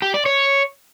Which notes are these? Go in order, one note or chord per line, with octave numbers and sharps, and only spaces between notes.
G4
D5
C#5